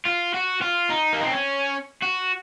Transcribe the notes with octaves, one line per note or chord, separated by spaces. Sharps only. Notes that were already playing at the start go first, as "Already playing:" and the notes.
F4
F#4
F4
D#4
A#3
C4
C#4
F#4